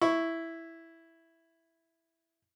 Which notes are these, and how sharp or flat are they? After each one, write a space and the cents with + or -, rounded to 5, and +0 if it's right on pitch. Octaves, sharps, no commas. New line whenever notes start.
E4 +0 C#6 +0